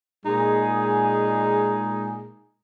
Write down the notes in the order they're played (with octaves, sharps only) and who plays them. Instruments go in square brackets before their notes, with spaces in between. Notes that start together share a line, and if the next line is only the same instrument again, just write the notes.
[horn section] A#2 G#3 D#4 G#4